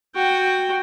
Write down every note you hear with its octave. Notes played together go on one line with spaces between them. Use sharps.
F#4 G5